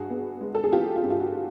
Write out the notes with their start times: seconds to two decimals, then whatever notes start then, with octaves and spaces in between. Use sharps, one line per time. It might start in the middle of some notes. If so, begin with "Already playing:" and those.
Already playing: G2 F#4 G#4
0.10 B3
0.41 G#3
0.55 A4
0.64 G#4
0.72 E3 F4 G4
0.96 F4
1.04 G2
1.10 F4
1.20 F#4